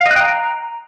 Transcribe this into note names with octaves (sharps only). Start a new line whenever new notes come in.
F5
D#5
F#6
G5
A#5